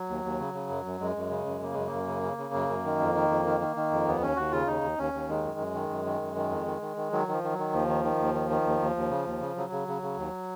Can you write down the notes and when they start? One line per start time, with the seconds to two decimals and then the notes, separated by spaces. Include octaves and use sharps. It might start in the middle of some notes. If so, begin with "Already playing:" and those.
Already playing: F#3
0.09 D#2
0.24 D#2
0.40 C#3
0.54 C#3
0.69 F#2
0.85 F#2
1.00 F#2 G#3
1.16 F#2
1.30 C#3
1.46 F#2
1.61 C#3 A#3
1.74 F#2 G#3
1.87 F#2 A#3
2.07 C#3
2.23 C#3
2.38 C#3
2.54 F#2
2.69 F#2
2.84 D#3
3.00 F2
3.14 D#3
3.30 F2
3.45 D#3
3.61 D#3
3.76 D#3
3.91 F2
4.06 D#2 B3
4.21 D#2 C#4
4.36 D#2 F#4
4.52 C#3 F4
4.67 D#2 D#4
4.82 D#2
4.98 D#2 C#4
5.13 D#2
5.29 D#3 G#3
5.43 F#2
5.59 F#2
5.74 D#3
5.89 F#2
6.05 D#3
6.21 F#2
6.36 D#3
6.51 F2
6.66 D#3
6.82 D#3
6.96 D#3
7.12 D#3 F#3
7.28 D#3 F3
7.43 D#3
7.53 F#3
7.59 D#3
7.73 D#2 F3
7.88 D#3
8.04 D#3
8.20 D#2
8.34 D#3
8.50 D#3
8.66 D#2
8.81 D#2
8.96 D#2
9.10 C#3
9.26 D#2
9.41 C#3
9.56 C#3 F#3
9.72 C#3
9.88 C#3
10.02 C#3
10.17 D#2